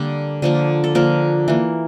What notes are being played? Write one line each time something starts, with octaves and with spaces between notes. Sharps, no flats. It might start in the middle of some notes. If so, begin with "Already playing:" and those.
Already playing: D3 G3 A#3
D3 F3 A#3
A4
D3 F3 A#3 A#4
E3 A#3